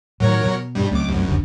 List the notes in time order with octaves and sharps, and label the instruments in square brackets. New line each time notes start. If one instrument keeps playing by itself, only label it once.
[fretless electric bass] A2 D#3 [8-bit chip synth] F#3 A#4 C#5
[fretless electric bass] B2
[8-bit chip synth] G2 G3
[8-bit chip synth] C#2 D6 [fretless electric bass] F#3 A3 C4
[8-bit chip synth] C2 F#2
[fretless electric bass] F1 C#2 D3